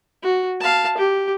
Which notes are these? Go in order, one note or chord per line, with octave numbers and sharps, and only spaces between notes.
F#4
F5 A5
G4